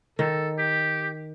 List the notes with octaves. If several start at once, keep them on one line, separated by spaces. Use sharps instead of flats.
D#3 A4
G4